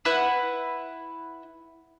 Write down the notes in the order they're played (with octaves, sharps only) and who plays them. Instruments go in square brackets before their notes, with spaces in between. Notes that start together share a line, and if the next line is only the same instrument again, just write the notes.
[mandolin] E4 B4 F#5